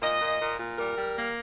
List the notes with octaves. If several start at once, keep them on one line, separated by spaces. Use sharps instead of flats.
A#2 D#5
A#2
A#2
A#2
G3 A#4
G3
A#3